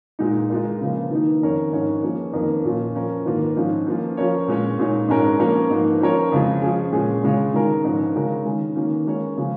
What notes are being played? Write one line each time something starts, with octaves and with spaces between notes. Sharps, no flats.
A#2 G#3 D#4
G#3 F4 A#4
C#3 F3 A#3
D#3 A#3 D#4
F2 D#3 C#4 A#4 C#5
G#2 F3 C#4 A#4 C#5
F3 A#3 C#4 G#4 C#5
F2 D#3 A#3 C#4 A#4
A#2 F3 A#3 C#4 F4
F3 C#4 A#4
G#2 D#3 A#3 F4
G#2 F3 C#4
F3 A#3 C#4 F4
F3 C#4 A#4 C#5
A#2 G#3 C#4
A#2 G#3 D#4 C#5
G#2 G#3 C#4 A#4
F3 A#3 C#4 A#4 C#5
G#2 F3 A#3
F3 C#4 A#4 C#5
F2 C#3 G#3 F4
F3 C#4 G#4
A#2 G#3 C#4 G#4
C#3 G#3 F4 G#4 C#5
D#3 G#3 C#4 A#4 C#5
G#2 F3 C#4 A#4
C#3 G#3 C#4 A#4
D#3 G#3 C#4
D#3 A#3 C#4
G#3 C#4 A#4 C#5
C#3 F3 G#3 C#4